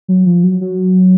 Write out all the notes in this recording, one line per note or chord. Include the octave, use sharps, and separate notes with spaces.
F#3
F3
F#3
F#3